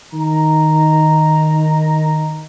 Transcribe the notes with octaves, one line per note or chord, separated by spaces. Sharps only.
D#3 A#5